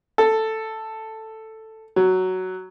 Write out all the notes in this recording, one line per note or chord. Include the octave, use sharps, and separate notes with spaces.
A4
F#3